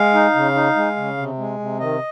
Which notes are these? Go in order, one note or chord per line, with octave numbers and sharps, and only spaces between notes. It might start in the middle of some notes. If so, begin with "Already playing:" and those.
Already playing: G#3 F5
D#4
C#3
D#4
G#3
C#3
C3
G#3
C3
D#3 D#5